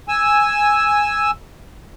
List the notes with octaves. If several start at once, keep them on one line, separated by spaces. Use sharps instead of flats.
G#5 E6